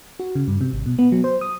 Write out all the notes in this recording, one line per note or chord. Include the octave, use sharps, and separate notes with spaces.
F#4
C#3
G2
C3
G#1
B2
B3
F#3
C5
D#6